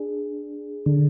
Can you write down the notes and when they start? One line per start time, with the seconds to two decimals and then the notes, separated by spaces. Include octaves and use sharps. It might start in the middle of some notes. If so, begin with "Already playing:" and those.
Already playing: D4 G#4
0.86 D3